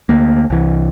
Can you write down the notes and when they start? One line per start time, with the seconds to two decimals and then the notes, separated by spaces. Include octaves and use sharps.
0.09 D2 A#3
0.50 C2 E3